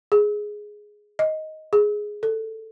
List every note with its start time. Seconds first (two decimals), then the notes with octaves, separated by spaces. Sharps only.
0.12 G#4
1.19 D#5
1.73 G#4
2.23 A4